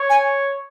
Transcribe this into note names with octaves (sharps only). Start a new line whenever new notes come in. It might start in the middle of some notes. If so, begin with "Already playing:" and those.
Already playing: C#5
G#5